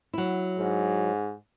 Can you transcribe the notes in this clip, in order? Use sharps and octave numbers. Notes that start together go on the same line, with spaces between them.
F#3 E4
G#2